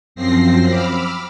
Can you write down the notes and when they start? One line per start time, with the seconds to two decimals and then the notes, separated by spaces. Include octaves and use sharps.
0.16 F#2 F3 C4 A#6 C7
0.67 B5 D6 E6 F6